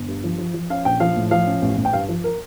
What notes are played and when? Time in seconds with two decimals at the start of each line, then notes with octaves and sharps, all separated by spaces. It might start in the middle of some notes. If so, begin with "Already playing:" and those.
Already playing: G1
0.08 G2
0.24 F3
0.39 F3
0.54 F3
0.70 C#4 F5
0.85 A#1 G5
1.00 F3 F5
1.16 A2
1.31 F3 F5
1.47 C#4
1.62 A1
1.77 A1
1.85 G5
1.93 G2 F5
2.09 F3
2.24 A#4